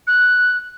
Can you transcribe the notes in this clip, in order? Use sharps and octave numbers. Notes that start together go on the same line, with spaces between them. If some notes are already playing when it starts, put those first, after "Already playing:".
F#6